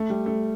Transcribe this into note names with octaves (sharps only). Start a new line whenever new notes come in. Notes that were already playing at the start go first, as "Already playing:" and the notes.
Already playing: A3
G3
A3